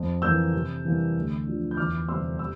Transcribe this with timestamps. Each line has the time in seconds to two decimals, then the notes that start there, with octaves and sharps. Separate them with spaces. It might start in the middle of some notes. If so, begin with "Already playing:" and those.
Already playing: F2
0.22 E3 A#3 E6 G6
0.53 C3
0.85 E3 G3 A#3
1.16 D2
1.47 D3 F3
1.71 G6
1.77 E2 D6 F6
2.08 C3 G3 C4 C6 E6
2.39 E6